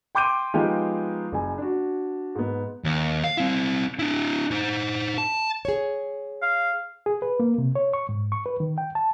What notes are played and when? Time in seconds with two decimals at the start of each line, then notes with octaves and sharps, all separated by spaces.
0.15 G5 C6 D6 G6 D7 D#7
0.54 F3 G#3 B3 D#4 F4 G4
1.32 F#1 G#5
1.58 D4 F#4
2.35 G#2 B3
2.84 D#2
3.24 F5
3.37 C4 E4
3.99 D4 E4
4.51 D#4 C5
5.18 A5
5.65 G#4 C#5
6.42 F5
7.06 G#4
7.22 B4
7.40 A#3
7.58 C3
7.75 C#5
7.94 C#6
8.09 G#2
8.32 C#6
8.46 B4
8.60 D#3
8.78 G5
8.95 A5